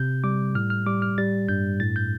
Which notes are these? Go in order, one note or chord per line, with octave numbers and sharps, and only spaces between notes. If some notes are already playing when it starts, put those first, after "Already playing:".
Already playing: C3 G6
G3 D6
A2 F6
F6
G3 D6
F6
G3 A6
G2 G6
A2 A6
G6